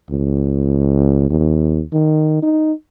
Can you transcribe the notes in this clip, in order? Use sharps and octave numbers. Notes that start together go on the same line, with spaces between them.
C#2
D#2
D#3
D#4